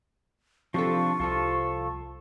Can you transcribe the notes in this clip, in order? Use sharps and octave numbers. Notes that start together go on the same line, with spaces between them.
C3 F3 D4 F4 A4 C#6
C2 F3 F4 A4